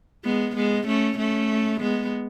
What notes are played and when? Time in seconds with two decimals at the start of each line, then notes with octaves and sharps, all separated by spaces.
0.24 G#3 B3
0.56 G#3 B3
0.87 A3 C#4
1.18 A3 C#4
1.80 G#3 B3